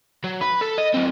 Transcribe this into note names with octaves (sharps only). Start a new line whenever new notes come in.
F#3
B4
A4
D#5
F#3 C4